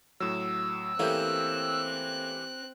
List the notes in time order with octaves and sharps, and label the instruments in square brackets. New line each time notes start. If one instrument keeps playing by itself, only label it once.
[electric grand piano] A2 F#3 [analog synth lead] E6
[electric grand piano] E3 G4 G6 [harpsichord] A3 A#3 C#4 [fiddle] C4 F#6